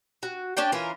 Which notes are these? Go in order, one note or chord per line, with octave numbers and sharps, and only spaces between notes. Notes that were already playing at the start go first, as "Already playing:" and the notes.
F#4
C#4 D4 D5 G5
E3 C#4 F4 A#4